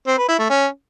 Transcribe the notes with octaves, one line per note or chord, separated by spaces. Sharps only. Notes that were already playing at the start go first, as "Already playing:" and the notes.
C4
B4
E4
A3
C#4